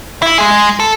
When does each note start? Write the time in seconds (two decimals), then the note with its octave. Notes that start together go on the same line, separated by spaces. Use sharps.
0.22 E4
0.38 G#3 G#4
0.80 A4